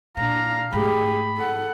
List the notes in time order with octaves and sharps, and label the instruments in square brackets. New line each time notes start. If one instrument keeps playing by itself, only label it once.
[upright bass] A#2 [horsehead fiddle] D4 F5 [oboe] A#5
[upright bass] G#2 A3 [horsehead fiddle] G4 G#4 [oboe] B5
[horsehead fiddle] A4 F#5